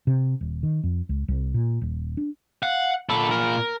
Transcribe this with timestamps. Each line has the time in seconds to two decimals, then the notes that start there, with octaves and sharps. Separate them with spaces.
0.07 C3
0.41 D#1
0.63 D#3
0.83 F2
1.09 C#2
1.28 C2
1.54 A#2
1.82 D#1
2.17 D4
2.63 F5 F#5
3.09 A#2 D3 A4 B5
3.31 A#4